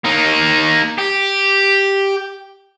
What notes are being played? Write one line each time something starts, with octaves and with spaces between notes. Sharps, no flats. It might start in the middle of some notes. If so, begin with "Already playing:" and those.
A#3 D#4
G4